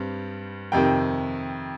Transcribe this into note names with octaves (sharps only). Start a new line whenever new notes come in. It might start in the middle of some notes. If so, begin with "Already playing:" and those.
Already playing: G2 G3 C4
F2 C3 D#3 G5